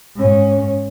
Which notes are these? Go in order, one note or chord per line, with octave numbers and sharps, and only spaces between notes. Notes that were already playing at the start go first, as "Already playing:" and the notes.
G#2 C#4